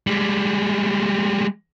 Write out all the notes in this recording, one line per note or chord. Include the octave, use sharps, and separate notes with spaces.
G3 G#3